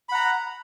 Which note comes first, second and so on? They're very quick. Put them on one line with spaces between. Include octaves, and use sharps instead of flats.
B5 F#5 A#5